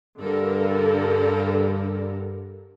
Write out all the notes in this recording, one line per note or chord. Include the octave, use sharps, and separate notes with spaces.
G2 D3 A4 A#4